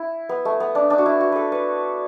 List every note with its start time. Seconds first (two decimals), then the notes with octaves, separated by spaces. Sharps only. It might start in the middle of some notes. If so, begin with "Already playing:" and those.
Already playing: E4
0.29 B3
0.45 A3
0.60 B3
0.75 D4
0.90 D4
0.98 F#4
1.06 E4
1.21 F#4
1.32 A4 B4
1.52 B4